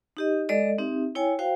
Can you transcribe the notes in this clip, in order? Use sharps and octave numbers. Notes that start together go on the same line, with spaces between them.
D#4 G4 D#5
G#3 A4 D5 D#5
C4 D#4 G4 E5
E4 C#5 G5 G#5
F#4 C5 F5 G5